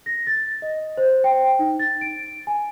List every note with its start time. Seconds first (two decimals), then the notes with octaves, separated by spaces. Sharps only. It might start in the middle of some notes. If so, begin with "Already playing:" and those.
0.06 A#6
0.27 A6
0.62 D#5
0.97 C5
1.24 G5
1.59 D#4
1.79 A6
2.01 D7
2.47 G#5